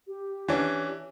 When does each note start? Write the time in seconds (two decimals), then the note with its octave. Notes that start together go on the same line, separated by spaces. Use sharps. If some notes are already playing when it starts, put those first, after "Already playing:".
0.07 G4
0.48 E3 C#4 D4